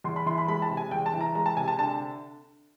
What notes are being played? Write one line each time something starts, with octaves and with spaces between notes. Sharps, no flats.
E2 C6
B5
E3 C6
B5
G#3 B5
A5
C3
G#5
E2 G5
A5
E3
A#5
G#3 A#5
A5
C3 G#5
A5
D3 A5